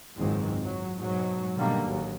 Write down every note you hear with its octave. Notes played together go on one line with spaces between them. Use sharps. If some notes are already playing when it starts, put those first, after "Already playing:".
F#1 C#2 G#2 D#3 G#3 C4
F#3
G#2 B2 F#3
B2 D3 D#3 G3 A#3
A1 D#2 F#3